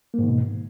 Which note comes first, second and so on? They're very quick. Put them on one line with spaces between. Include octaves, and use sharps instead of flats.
A#3 G#2 D#3 B2